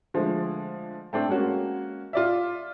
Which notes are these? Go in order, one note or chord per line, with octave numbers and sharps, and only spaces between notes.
D3 F3 G#3 A3
A3 C4 D4
G#3 A#3 C#4 F#4
F4 D5 E5